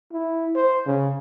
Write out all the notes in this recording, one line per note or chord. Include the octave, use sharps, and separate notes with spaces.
E4
C5
C#3